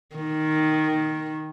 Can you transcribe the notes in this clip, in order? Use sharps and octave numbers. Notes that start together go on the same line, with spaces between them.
D#3